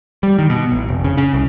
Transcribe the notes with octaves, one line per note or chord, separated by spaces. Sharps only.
G3
D#3
B2
A1
F1
C#3
C#3
C2